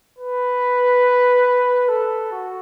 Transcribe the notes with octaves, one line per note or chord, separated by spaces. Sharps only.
B4
A4
F#4